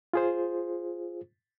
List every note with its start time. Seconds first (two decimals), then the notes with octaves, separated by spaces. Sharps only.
0.13 F4 G#4 C5